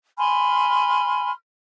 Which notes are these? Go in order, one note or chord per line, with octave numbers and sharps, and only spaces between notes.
G#5 B5 C6 F6